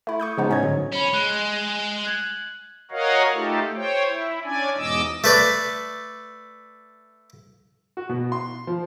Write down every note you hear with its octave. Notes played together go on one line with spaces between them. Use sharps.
A3 E4
C#6 D#6 G6
C#3 F3 G#3 B3 D#4
A2 C#4 C#5 D#5 G#6
G#2 D3 F#3
C#4 C#5 B5
G#3 F#6 G7
F#6 G#6 F#7
F#4 A#4 C#5 D#5 F5 F#5
A3 D#4 F4 G4 A4
C5 C#5 G5
E4
C#4 D4 D5 G#5
E2 G#2 B2 D#5 D6 E6
A3 B4 D5
F#4
B2
C6
F3